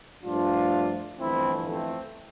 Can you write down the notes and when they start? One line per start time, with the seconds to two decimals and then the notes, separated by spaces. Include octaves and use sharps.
0.23 G2 F3 A3 D4 F4
1.19 G1 F2 E3 A3 C4 E4
1.67 A3 C4